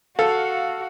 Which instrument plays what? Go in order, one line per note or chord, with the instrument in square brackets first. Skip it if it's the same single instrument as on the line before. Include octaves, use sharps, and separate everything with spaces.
[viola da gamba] F#4 [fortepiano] A4 [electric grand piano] F5